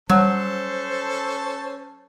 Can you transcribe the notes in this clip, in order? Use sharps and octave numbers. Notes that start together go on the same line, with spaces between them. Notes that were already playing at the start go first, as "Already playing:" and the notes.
F#3 G3 C#4 A4 C5 A5